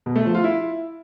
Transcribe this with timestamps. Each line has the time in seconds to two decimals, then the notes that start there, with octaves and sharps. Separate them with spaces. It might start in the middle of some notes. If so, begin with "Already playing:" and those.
0.06 B2
0.16 A3
0.25 F3
0.34 F4
0.44 E4